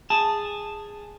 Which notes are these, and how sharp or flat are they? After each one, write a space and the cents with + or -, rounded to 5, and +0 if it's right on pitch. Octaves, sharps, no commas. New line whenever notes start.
G#4 -10 A5 +0